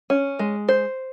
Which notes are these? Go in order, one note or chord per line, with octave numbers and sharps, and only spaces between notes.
C#4
G#3
C5